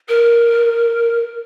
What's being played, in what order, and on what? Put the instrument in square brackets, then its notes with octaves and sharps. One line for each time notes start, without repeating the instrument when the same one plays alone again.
[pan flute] A#4